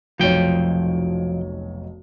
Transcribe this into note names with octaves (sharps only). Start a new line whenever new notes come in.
F1 B1 F3 C#5 G5